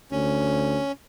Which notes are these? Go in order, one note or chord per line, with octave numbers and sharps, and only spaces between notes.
D2 C#4